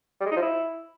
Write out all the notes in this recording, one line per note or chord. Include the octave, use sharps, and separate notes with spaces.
G3
G#3
D#4
F3
E4